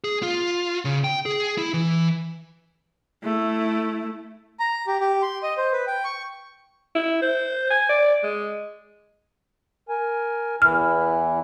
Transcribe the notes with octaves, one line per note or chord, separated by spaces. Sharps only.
G#4
F4
C#3
G5
G#4
E4
E3
A3 E4
A#5
G4
G4
C6
D#5
C5
B4
G5
C#6
E4
C5
G#5
D5
G#3
A#4 G#5
E2 E3 E4 F6